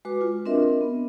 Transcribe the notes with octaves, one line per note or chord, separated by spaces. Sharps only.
G#3 F#4 B4 D6
F4
C4 D4 A#4 D#5 E5
B3